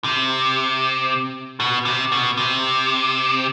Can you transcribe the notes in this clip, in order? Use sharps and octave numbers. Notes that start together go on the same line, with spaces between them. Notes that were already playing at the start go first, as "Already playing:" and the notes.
C3
B2
C3
B2
C3